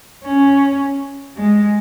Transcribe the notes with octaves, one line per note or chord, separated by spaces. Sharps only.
C#4
G#3